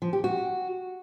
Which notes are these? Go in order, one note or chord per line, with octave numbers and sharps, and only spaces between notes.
F3
G4
F#4